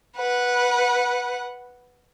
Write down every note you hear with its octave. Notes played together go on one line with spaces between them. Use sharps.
B4 F#5